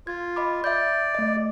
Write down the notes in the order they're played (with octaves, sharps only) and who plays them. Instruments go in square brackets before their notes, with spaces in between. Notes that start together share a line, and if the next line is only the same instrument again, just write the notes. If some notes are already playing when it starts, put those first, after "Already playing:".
[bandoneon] F4 [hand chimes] G#6
[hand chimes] D#5 B5 D6
[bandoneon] D5 [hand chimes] E5 G6
[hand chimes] A3 D#5